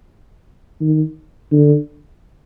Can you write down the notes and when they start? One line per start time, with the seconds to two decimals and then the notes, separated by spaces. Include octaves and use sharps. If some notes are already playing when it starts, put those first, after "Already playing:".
0.81 D#3
1.52 D3